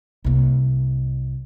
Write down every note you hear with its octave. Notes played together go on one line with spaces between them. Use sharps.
C2 A#3